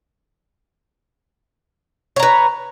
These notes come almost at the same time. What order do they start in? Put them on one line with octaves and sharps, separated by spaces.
C#5 A#5 B4